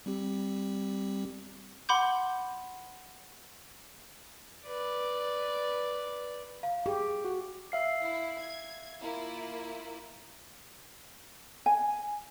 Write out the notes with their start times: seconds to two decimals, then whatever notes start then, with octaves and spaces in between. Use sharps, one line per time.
0.06 G3 C4 G4
1.89 F#5 B5 C6 D6 G6
4.67 B4 D5
6.63 F5
6.86 G4 G#4
7.25 F#4
7.72 E5 F5 C7
8.02 E4
8.39 G#6
9.01 A#3 E4 F4
11.66 G#5